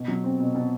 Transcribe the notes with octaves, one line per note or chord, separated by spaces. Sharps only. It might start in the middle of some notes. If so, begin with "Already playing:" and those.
Already playing: B2
F#3
C4
B2
B2